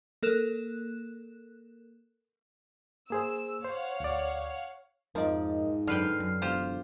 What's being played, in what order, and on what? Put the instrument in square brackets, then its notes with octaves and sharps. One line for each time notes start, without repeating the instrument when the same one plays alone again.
[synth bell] A#3 A4 A#4 F#6 E7
[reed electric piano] A#3 G#4 C5 [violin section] E6
[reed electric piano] C5 [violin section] C#5 F5 F#5
[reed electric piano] D2 D5
[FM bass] F2 [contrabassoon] G#2 [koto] F3 D5 [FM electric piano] A#4 D#5
[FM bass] F#2 [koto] D3 B4 G5 [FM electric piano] D5 F6 C7
[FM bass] F#2
[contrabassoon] E1 [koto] F4 G4 C5